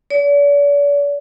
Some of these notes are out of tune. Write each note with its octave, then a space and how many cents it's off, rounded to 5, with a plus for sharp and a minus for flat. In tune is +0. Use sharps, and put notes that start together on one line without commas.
D5 -45